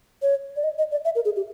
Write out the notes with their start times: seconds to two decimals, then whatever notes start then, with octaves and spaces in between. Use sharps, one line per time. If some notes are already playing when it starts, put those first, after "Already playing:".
0.22 C#5
0.56 D5
0.64 D#5
0.78 D#5
0.92 D5
1.05 E5
1.15 A#4
1.25 G#4
1.36 G4